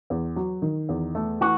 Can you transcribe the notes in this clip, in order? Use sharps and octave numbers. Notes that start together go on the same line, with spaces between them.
E2
F#3
D#3
E2
A3
E3 F#4